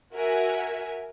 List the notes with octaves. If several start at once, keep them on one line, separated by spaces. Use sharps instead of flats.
F#4 A#4 E5 G#5